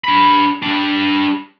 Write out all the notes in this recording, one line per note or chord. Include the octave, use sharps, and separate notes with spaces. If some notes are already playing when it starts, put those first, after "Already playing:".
D4 B5
G3 D4